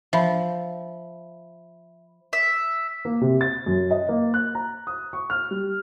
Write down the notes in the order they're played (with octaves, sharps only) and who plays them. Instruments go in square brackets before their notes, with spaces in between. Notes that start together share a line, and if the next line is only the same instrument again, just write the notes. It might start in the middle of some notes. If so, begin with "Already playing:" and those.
[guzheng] F3 [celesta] E5 B5
[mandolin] E5
[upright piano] A#3
C3
A6
F#2
D#5
A#3
F#6
A#5
D#6
C#6
F6
G3